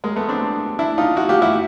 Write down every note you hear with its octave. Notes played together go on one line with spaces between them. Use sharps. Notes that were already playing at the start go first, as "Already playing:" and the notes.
G#3 A#3
A3 B3
C4 D4
D4 E4
D#4 F4
E4 F#4
F4 G4
E4 F#4